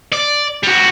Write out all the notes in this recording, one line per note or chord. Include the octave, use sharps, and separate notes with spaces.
D5
G3 F#4